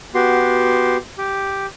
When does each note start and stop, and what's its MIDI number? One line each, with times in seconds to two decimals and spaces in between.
0.15 0.97 59
0.15 0.97 66
0.15 0.97 67
0.15 0.97 84
1.18 1.66 67